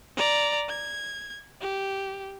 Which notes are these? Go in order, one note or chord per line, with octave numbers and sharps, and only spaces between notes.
D5 A#5
G#6
G4